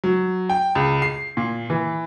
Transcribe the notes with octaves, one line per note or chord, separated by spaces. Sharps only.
F#3
G5
C#2
C7
A#2
E3